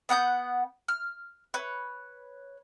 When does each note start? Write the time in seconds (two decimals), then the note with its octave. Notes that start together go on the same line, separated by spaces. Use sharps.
0.09 B3 F#5 D#6 G6
0.88 F6
1.54 B4 C#5